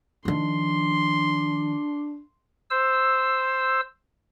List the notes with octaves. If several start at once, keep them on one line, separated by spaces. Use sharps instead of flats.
D#3 F3 D4 C6
C5 E6